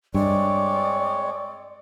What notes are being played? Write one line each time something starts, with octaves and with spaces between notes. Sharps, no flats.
G2 G#3 C4 C#5 D5